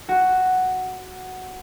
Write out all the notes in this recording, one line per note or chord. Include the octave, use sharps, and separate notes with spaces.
F#4